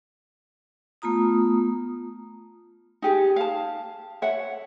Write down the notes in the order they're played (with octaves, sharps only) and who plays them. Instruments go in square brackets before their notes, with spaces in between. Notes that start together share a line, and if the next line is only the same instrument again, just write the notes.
[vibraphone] A3 B3 F4 A#5 D#6
[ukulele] D#4 G4 G#4
F5 A5
C#5 E5 F#5